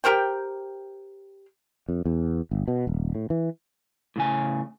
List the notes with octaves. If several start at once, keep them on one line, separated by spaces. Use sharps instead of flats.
G4 A#4 C5 G5
F2
E2
G1
B2
D#1
A2
E3
A2 C#3 G#5